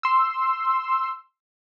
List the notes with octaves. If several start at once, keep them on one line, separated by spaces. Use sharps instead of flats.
C6 E6